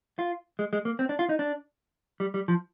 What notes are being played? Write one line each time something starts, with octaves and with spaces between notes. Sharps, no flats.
F4
G#3
G#3
A#3
C4
D4
F4
D#4
D4
G3
G3
F3